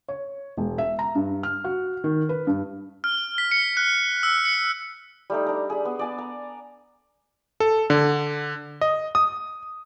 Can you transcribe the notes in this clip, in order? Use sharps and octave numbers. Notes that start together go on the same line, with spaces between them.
C#5
E1
E5
A#5
G2
F6
F#4
D#3
B4
G2
F6
B6
C#7
F#6
E6
C#7
G3 A3 D#4
D4 A#5
G#4 B5
B3
D5 G#5 A5
A#5
A4
D3
D#5
D#6